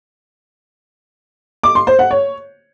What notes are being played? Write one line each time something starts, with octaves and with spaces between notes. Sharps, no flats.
D6
C6
C5
F#5
C#5